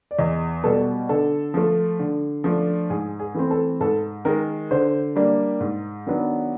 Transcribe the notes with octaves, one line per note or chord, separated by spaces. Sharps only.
D5
E2 D#5
B2 G3 B3 A4
D3 A4
F3 A3
D3
F3 A3 D4
G#2 G#4
G#4
E3 A3 C4
A4
G#2 A4
D#3 G#3 A#4
D3 C5
G3 A#3 D4
G#2
D#3 F#3 B3 D4